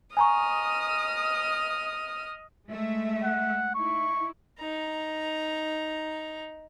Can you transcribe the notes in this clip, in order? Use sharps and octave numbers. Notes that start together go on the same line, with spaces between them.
D#5 G#5 A#5 C#6 D#6 F6
G#3 A3 E5
F#5
D#4 E4 C#6
D#4 A#5